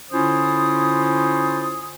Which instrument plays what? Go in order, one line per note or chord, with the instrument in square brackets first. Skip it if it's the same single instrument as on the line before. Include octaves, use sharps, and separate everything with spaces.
[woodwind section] D3 C#4 E4 F4 C5 D#6